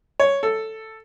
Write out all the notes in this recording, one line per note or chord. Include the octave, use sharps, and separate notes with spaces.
C#5
A4